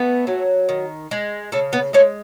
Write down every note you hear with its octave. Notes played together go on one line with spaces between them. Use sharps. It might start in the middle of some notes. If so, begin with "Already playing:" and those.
Already playing: A3 B3
F#3
D#3
G#3
C#3 A3
B3
G#3 A3 C#4